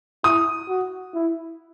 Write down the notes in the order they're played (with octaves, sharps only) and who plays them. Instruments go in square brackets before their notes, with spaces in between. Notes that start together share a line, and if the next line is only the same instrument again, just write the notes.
[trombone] E4 [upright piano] D#6
[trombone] F#4
E4